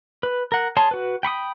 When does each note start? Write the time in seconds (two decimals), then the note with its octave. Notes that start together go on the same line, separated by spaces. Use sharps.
0.23 B4
0.52 A#4 F#5
0.77 G#4 C#5 A5 C6
0.91 F#4 B4
1.23 G5 B5 C#6 D#6